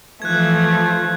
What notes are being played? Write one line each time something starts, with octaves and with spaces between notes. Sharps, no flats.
E3 F3 A3 F#6 G#6